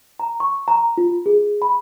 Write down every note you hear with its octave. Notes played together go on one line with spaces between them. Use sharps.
A#5
C#6
A#5
F4
G#4
B5